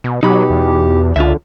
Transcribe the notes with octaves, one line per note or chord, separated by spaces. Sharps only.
B2
B2 F#3 D#4 G4 B5
E2
C#2 D3 F4 E5